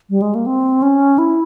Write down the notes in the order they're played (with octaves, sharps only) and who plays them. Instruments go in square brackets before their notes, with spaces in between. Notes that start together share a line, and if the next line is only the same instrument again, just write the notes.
[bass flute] G3
G#3
A#3
C4
C#4
E4